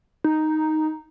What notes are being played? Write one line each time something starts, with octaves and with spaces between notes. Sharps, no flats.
D#4